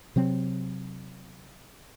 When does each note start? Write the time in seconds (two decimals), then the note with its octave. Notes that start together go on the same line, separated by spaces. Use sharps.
0.16 C3 F#3 C4